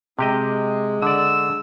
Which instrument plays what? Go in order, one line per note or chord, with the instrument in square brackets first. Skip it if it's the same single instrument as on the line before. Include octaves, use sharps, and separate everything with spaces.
[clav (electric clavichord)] C3 G4 D#5 [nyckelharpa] G#3
[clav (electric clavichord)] D3 D5 [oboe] E6